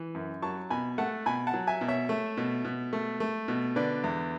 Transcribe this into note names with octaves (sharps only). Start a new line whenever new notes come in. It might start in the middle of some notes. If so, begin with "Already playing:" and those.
Already playing: E3
F#2
F#3 A5 C#6
B2 G#5 B5
A3 F#5 A5
B2 G#5 B5
F#5 A5
F#3
E5 G#5
B2
C#5 E5
A3
B2
B2
A3
A3
B2
D3 B4 D5
E2